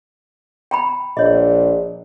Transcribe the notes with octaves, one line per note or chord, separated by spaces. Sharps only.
G5 A#5 B5
A#1 C#5 D#5